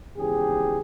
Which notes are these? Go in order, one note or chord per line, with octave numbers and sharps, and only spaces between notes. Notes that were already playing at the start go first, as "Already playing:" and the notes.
G#1 E2 C#3 E3 G4 G#4